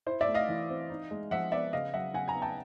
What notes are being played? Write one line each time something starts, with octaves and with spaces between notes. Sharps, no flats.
E4 C5
D5 E5
A3
D#5 F5
E3
C4
D#4
G#3
F3 E5 F#5
B3 D5 E5
C#3 D#5 F5
F#3 E5 F#5
C#3 F#5 G#5
G#5 A#5
B3
G5 A5